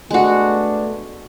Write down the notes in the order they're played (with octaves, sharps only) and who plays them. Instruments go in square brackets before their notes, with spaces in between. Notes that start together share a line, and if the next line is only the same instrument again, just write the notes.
[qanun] G#3 F#4 [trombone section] A3 B3 D4